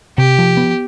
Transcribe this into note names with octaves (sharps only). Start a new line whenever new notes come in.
C3 G4
F3
B3